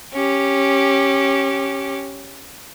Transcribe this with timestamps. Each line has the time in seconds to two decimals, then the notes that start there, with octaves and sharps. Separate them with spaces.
0.15 C#4 G4